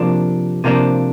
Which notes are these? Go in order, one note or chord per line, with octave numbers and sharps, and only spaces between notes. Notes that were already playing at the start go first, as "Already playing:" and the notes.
Already playing: C3 F3 A#3 D4
C3 F3 A#3 D4